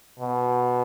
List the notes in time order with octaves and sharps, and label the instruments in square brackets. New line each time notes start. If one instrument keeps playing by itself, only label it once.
[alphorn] B2